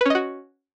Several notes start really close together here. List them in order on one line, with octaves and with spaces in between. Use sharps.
B4 C#4 D#5 F#4